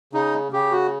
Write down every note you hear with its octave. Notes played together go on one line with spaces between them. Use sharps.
C#3 D#4
C#3 G4
F#4